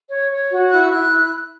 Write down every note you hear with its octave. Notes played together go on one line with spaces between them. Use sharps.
C#5
C#5
F#4
E4 F#6
E6
E4 F#6
E4